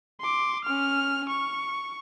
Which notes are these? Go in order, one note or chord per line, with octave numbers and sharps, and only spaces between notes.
C6 D6
C#4 F6
C#6